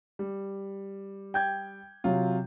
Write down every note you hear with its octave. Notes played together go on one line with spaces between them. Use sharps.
G3
G5 G6 G#6
C3 F#3 F4